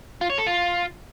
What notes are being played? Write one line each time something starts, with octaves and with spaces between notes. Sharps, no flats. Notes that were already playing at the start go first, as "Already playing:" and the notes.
F4
C#5
A4
F4